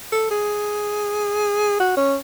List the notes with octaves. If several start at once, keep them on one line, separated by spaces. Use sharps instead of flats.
A4
G#4
F#4
C#4